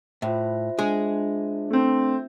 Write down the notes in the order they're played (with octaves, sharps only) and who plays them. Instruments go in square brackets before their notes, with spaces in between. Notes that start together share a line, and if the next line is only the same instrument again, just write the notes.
[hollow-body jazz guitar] A2 [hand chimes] F4 C5 E5
[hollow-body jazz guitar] G#3 G#4 [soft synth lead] D4
[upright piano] A3 C4